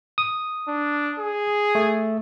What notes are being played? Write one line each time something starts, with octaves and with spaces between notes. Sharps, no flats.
D#6
D4
G#4
A3